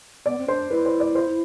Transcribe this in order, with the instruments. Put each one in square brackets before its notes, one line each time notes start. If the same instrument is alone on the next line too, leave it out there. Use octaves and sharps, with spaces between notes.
[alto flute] B3 [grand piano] D5
[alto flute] C4
[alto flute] D4 [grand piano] C5
[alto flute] E4 [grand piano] B4
[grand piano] C5
D5
C5